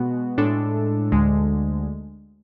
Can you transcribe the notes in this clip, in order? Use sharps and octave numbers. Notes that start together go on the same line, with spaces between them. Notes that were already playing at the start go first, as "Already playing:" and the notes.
Already playing: B2 G#3 B3 F#4
A2 G#3 D4 A4
D2 D3 G#3